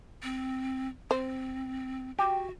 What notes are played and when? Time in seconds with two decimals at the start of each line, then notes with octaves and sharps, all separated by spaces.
0.23 C4
1.11 C4 C5
2.19 F#4 G4